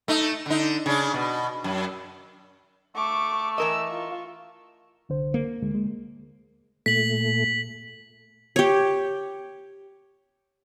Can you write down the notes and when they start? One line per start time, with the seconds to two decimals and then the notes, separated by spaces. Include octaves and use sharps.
0.08 A3 D#4
0.46 D3 D#4
0.86 C#3 D4
1.14 B2
1.64 F#2
2.96 A3 C#6 D6
3.58 E3 A#4 D#5 E6
3.87 F4 C#6
5.09 C2 D3 C5
5.34 A#3
5.62 D2 D3 G#3
5.74 G#3
6.86 A#2 A3 B6 F#7
8.56 G4 C#5